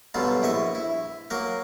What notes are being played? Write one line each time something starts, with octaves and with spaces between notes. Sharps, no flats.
B2 D3 F#3 G3 F4
A#1 E4 D#5 C#6
E4
F#3 A#3 A#4